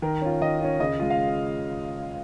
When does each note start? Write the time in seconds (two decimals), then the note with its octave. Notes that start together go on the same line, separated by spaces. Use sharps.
0.02 D#3 A#4
0.22 C#4 F4
0.41 D#3 D#5
0.61 C#4 F4
0.80 C#3 D#5
0.99 G#3 F4
1.10 F5